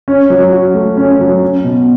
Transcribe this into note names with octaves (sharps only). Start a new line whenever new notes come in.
C#4
F#3
F#4
A3
C#4
F#3
C#4
B2